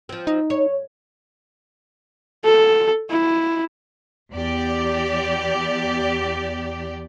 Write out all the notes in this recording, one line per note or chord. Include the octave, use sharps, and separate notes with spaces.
F3 C4
D#4
C#5
A4
E4
E2 G4 D5